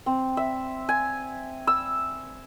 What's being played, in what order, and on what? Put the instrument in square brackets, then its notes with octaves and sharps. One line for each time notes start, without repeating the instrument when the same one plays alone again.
[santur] C4
E5
G#5
E6